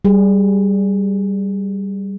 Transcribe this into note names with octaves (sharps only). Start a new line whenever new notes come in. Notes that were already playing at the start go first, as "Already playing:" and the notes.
G3 G#4